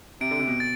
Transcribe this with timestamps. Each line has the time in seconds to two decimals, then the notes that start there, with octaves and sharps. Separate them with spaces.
0.21 C3 D7
0.31 D3
0.39 C3
0.47 B2
0.60 A6